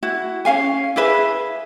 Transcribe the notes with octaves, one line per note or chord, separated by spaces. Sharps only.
E4 F#4
C#4 F#4 F5 G#5
E4 G#4 B4 E5